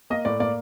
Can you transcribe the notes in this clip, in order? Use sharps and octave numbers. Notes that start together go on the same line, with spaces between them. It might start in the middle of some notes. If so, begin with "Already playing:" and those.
A#3 D#5
A2 D5
A#3 D5